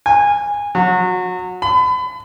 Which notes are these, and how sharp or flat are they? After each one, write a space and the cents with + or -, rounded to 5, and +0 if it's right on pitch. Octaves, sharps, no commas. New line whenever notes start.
G#5 -20
F#3 -20
B5 +35